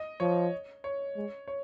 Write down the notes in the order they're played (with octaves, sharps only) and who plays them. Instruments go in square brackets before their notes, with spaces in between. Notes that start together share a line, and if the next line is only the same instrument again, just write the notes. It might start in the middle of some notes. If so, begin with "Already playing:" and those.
Already playing: [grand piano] D#5
[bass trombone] F3 [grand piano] C#5
[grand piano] C#5
[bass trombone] G#3
[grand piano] C#5